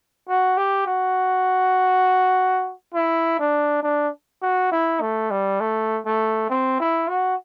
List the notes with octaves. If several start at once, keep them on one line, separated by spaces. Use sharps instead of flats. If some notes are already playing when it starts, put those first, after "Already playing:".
F#4
G4
F#4
E4
D4
D4
F#4
E4
A3
G3
A3
A3
C4
E4
F#4